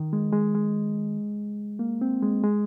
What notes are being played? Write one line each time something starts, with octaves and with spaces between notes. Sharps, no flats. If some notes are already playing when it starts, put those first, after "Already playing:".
Already playing: D#3
G#3
G#3
G#3
A#3
C4
G#3
G#3